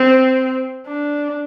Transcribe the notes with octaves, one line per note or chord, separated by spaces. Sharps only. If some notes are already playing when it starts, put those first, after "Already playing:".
Already playing: C4
D4